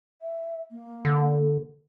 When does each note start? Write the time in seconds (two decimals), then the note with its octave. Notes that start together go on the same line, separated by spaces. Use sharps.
0.22 E5
0.71 A#3
1.05 D3